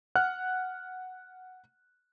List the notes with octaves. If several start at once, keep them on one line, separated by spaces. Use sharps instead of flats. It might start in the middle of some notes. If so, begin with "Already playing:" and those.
F#5 F6 F#6